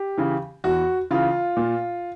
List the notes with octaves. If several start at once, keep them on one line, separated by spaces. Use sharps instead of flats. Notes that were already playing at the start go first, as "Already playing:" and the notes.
Already playing: G4
C#3 E3
E2 F#4
C#3 E3 F4
A#2